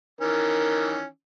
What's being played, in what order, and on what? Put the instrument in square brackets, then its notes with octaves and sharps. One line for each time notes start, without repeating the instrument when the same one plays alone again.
[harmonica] D#3 E3 C#4 [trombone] A#4